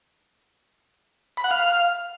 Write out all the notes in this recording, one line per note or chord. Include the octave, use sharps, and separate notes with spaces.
B5
F#5
F5